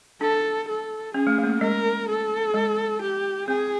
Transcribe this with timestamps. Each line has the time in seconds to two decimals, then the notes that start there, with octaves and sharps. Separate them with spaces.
0.21 D4 A4
0.68 A4
1.14 C#4 G#4
1.27 A3
1.38 A3
1.43 A#3
1.49 A3
1.61 G#3 A#4
2.08 A4
2.54 G#3
3.01 G4
3.48 C4 G#4